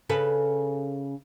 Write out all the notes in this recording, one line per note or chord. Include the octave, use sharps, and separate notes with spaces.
C#3 A4 B4